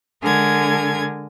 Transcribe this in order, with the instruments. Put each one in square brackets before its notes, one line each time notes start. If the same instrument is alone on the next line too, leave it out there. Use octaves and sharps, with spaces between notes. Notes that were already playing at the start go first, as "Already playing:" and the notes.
[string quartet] D3 G#3 A#4 G#5 G#6